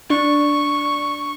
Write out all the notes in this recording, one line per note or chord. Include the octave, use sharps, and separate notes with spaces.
D4 C#6